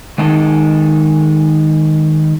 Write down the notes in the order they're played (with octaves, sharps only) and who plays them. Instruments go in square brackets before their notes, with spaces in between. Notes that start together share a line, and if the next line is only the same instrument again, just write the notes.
[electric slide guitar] D#3 G#3 D#4 A4 A#4